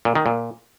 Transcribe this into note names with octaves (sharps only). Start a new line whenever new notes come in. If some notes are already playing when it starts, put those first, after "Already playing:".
A#2
D#3
A#2